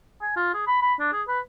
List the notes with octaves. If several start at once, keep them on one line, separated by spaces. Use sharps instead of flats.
G#5
F4
G#4
B5
B5
D4
G#4
B4